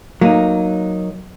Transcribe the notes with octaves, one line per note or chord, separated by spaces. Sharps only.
F#3 A#3 D#4